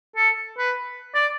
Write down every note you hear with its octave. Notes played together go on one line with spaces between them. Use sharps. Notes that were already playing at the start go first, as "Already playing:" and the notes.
A4
B4
D5